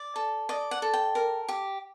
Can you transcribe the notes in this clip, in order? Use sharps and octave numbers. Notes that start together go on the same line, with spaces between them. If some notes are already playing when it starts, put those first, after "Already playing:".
Already playing: D5
A4
D5 D#5
F#5
A4
G5
A#4
G4